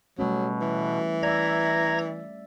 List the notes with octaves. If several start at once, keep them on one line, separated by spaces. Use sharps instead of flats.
B2 F#3 G3 A3 C#4
E3
D5 E5 A#5 G#6 A#6